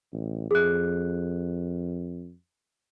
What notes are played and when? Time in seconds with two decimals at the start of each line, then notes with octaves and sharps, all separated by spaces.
0.13 A1
0.51 F2 G#4 F#6